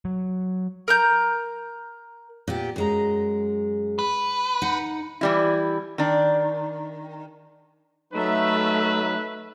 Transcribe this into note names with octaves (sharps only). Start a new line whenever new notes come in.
F#3
A#4 A#5 G6
A#2 B3 G4
F#2 G#3 A#5
B4
D#4 F#5
E3 G3 E4
D#3 D4
F#3 A3 D#4 B4 E5